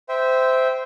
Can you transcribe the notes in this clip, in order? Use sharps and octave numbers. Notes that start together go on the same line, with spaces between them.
C5 E5 G5